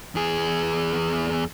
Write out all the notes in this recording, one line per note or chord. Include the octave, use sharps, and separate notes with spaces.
E2 G#4